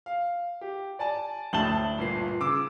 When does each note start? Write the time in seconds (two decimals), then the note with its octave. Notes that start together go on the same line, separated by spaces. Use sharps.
0.06 F5
0.61 G4
0.99 D5 G#5 A5
1.53 D2 A2 A5 F#7 G7
1.98 G1 A#2 C7
2.40 C#3 D6 E6